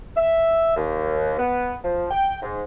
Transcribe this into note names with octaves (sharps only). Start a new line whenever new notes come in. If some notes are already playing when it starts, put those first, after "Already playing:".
E5
D#2
B3
F3
G5
G#2